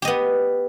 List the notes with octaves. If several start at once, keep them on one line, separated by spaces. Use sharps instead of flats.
B3 G4 D#5